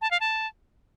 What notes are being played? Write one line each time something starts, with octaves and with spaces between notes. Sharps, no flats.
A5
F5
A5